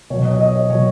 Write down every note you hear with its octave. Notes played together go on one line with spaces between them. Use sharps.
B2 F#3 C#5
D#5
C#5
D#5
C#5
B2 F#3 C#5